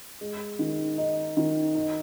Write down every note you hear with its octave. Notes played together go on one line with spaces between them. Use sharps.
G#3
D#3
D#4
D#3
D#4